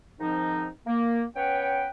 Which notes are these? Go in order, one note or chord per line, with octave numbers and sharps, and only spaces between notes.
G#2 D#3 F3 C4 D#4
A#3
B3 C#4 B4 C#5 G5